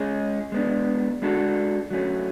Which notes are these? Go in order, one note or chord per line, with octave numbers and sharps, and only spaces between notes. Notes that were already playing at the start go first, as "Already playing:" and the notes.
Already playing: G#3 C#4 G#4
G#3 B3 D4
G#3 D4 F#4 A4
F#3 A3 C#4